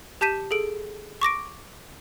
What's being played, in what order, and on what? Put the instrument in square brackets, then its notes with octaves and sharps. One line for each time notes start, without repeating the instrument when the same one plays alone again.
[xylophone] G4 A5 G6 B6 D#7 E7
G#4 A4 D7
C#6 D6 A#6 D7